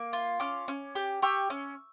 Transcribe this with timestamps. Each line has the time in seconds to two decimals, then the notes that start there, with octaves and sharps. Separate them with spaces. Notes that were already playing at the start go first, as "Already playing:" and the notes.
Already playing: A#3
0.13 F4
0.40 C#4 D6 F6
0.68 C#4
0.95 G4
1.22 G4 C#6 E6
1.50 C#4